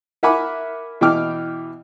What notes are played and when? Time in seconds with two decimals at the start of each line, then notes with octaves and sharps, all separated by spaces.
0.23 A#4 E5 F#5 G#5 B5 D6
1.01 B2 E3 E4 G5 D6 F6